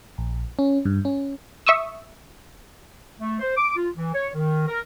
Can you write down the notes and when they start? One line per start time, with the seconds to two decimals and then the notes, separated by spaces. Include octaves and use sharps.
0.18 A#1
0.59 C#4
0.85 G2
1.05 C#4
1.66 E5 C#6 D#6 E6
3.18 A3
3.40 C5
3.56 D6
3.76 F4
3.94 E3
4.13 C#5
4.34 D#3
4.67 A#4